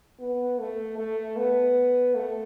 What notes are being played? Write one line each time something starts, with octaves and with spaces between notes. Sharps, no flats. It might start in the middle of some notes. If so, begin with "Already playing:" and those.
B3
A3
A3
B3
A3